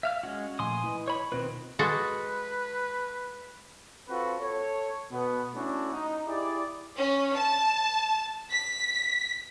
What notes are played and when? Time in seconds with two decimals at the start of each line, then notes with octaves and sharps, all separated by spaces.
0.03 E5 F5 F6
0.23 G#3 C#4 F#4
0.59 A#2 F3 A3 G#5 C6 D#6
0.84 E4 B4 D#5
1.08 C#5 B5
1.32 B2 D#3 C4 F4 B4
1.79 G#3 F#4 A4 B4
4.08 C4 F4 F#4 A4 B4
4.40 A4 C#5
5.11 B2 B3
5.54 A3 C#4 D4 E4 F#4
5.93 D#4
6.26 E4 G4 G#4 D5
6.96 C#4
7.35 A5
8.51 B6